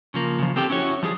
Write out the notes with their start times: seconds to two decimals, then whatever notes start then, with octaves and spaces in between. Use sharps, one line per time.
0.14 C#3 F3 A#3
0.38 C#3 F3
0.56 C4 G4 A4 G5
0.70 C#4 E4 F#4 C#5
1.03 F3 G3 G#4